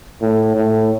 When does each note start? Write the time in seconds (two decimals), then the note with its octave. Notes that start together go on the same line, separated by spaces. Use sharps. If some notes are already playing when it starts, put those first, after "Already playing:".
0.22 A2
0.55 A2